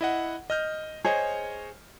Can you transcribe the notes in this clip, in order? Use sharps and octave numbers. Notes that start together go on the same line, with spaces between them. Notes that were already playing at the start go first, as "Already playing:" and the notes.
E4 D#5 F#5
D#5 F6 G6
G#4 C5 C#5 D#5